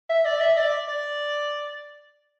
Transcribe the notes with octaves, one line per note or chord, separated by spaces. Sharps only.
E5
D5
E5
D5
D5